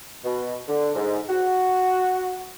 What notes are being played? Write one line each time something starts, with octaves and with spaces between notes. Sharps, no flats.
B2
D3
G#2
F#4